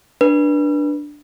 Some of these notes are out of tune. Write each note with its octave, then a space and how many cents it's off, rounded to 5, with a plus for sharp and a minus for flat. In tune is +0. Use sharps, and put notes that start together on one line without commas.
D4 +0 B4 -25